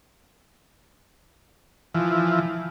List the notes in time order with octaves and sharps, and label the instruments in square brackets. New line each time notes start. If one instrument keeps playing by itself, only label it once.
[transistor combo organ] E3 F3